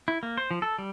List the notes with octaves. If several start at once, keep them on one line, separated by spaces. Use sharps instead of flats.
E4
A#3
C5
F3
A4
G3